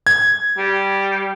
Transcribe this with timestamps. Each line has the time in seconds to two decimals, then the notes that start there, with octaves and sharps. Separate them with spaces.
0.07 G#6
0.58 G3